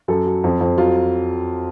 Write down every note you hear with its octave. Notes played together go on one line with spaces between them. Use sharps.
F#2 A4
F#3
F2
F2
F#3 F4